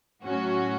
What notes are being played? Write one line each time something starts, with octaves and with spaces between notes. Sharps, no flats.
A2 F#3 C#4 F#4